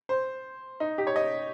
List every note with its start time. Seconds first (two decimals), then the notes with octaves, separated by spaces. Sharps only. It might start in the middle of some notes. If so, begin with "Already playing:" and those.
0.09 C5
0.80 D#4
0.98 G4
1.07 C#5
1.16 D#5